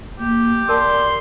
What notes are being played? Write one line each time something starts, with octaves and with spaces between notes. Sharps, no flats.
A#3 G4
A#4 D5 A5 C6